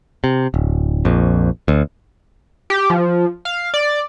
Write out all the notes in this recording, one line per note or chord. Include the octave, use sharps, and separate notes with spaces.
C3
D1
A#1 F2
D2
G4
F3
F5
D5